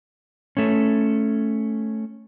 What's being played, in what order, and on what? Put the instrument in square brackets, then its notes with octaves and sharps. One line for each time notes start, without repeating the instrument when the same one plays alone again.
[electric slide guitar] A3 C#4